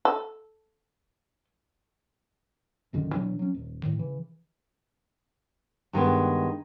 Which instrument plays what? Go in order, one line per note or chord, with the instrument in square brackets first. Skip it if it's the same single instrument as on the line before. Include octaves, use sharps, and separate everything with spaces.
[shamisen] A4
[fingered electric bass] A#1 F#2 D3 D#3
B2 E3 F#3 D4
F#3 C#4
D#1
A2 D#3
C#3 E3
[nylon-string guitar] G2 D#3 G#3 B3